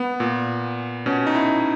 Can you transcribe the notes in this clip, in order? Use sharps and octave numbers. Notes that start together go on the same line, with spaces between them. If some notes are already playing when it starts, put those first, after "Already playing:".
Already playing: B3
A#2
B2 C#4
D#4
E4